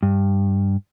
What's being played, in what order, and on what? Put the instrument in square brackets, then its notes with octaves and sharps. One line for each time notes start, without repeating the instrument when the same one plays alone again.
[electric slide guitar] G2